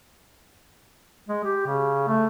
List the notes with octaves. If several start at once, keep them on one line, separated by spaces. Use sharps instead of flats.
G#3
G4
C#3
A3